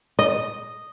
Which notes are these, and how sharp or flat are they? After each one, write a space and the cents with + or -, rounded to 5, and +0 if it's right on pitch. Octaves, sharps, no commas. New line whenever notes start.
D#5 -5